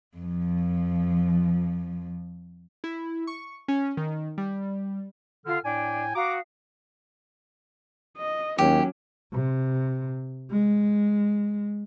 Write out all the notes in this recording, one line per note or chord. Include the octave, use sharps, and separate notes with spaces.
F2 F3
E4
C#6
C#4
D#3
G3
D3 F4 F6
A2 D4 G5 G#5
F#4 F5 A#5 D6 D#6
D#5
D#2 F#3 C#4 G4
C3
G#3